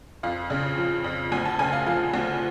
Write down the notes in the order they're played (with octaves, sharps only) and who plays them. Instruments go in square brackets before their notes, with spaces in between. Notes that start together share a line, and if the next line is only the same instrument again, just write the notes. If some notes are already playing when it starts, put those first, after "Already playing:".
[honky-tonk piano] F2 F5
C#3
F3
F2
D2 G#5
A5
C#3 G#5
F5
F3 F5
D2